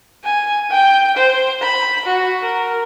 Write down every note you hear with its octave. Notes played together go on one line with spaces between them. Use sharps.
G#5
G5
C5
B5
F#4
A#4